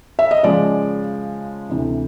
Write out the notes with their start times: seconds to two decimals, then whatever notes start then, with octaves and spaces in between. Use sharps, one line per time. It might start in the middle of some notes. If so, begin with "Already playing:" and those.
0.19 E5
0.31 D#5
0.43 C#3 F3 G#3 D5
1.69 D2 C3 E3